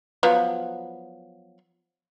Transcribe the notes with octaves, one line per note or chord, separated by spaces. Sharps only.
F3 F#3 B3